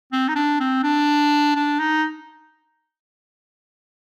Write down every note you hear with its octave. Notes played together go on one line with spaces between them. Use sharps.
C4
D#4
D4
C4
D4
D4
D#4